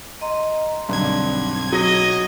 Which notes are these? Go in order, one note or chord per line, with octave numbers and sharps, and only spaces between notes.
D#5 A#5 C6
B1 G2 D3 C4 G#6
F#3 D#5 A#6